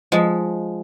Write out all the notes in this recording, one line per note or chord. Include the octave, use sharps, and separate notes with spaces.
F3 G#3